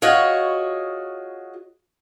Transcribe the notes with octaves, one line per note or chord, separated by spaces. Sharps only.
F4 F#4 G#4 C#5 D#5